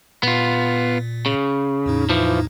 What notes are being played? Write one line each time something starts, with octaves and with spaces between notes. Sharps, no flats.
A#2 B3 F4
C#3
E2 A2 D#4
E3 F3